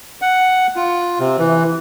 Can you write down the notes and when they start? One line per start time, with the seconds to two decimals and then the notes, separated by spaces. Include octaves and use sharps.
0.22 F#5
0.76 F4
1.20 C3
1.39 E3